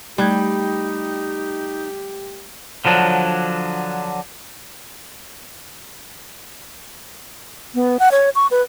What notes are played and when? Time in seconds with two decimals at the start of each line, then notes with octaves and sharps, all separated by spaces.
0.18 G3 A3 D#4 G4 F#6 G#6
2.85 D3 F3 F#3 D4
7.75 B3
7.99 F#5
8.11 C#5
8.35 C#6
8.51 B4